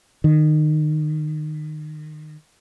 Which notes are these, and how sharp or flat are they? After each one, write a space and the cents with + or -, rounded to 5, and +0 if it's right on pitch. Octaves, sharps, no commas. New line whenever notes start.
D#3 -25